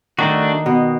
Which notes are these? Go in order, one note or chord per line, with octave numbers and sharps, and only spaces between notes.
D#3 A3 D4 F#4
B2